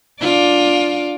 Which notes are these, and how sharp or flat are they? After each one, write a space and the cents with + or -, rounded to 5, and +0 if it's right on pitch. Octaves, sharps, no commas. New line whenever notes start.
D4 +0 F4 +15 D5 +0